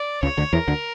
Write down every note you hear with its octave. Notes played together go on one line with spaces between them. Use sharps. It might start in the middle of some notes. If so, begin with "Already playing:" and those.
Already playing: D5
C#2 C#3 C#5
D2 D3
E2 E3 A#4
D2 D3